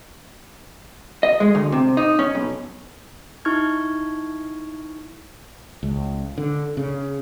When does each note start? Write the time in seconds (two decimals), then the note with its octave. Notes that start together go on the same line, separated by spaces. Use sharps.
1.23 D#5
1.40 G#3
1.55 D2
1.72 C3
1.97 D#4
2.19 C#4
2.35 B1
3.45 D#4 E4 C#6 F6 G#6
5.83 C#2
6.38 D3
6.77 C#3